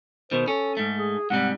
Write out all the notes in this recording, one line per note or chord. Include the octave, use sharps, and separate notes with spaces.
B2 D#3 C5
C#4 A4
G#2 A3
G#4
G#2 C3 G3 F#5